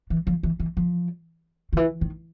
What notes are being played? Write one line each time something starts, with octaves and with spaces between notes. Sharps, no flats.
E3
F3
E3
E3
F3
D#3
E3
D#3